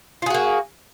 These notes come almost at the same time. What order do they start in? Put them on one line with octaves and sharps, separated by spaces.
F4 G#4 F#4 A#3